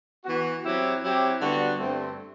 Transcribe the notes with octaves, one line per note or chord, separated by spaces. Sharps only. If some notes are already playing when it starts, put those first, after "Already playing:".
E3 B3 F#4
F#3 C4 E4 G4
F#3 C4 E4 G4
D3 G3 B3 F#4
G2 D3 A3 C4